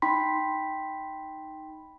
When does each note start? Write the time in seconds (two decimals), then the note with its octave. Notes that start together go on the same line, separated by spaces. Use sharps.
0.02 D#4 G5 B5 C6 B6